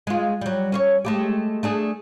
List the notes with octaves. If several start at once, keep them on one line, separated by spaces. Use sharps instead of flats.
G#3 F4
F#3 G3
C#4 C5 C#5
G#3 A3 G4
A3 D4 G#4